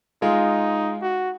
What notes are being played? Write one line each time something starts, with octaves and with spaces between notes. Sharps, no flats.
G#3 D#4 F4
F#4